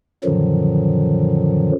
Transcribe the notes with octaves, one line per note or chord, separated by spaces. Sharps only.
F#2 A#2 D3 D#3 F3 F#3